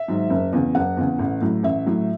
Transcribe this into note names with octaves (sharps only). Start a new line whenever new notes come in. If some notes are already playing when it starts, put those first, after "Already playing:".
Already playing: E5
G#2 D#3 F#3
F#1
E2 C#3
F#1 F#5
E2 C#3
A1
A2 F#3
A1 E5
A2 F#3